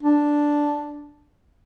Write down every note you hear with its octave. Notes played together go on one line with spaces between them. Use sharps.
D4